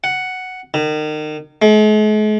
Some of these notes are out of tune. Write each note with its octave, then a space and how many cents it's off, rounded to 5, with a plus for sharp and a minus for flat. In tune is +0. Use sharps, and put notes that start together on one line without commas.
F#5 +5
D#3 -30
G#3 +45